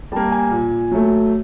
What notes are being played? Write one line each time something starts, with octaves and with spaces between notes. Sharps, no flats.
G3 A#3 A5
G#5
A#2
F#3 A3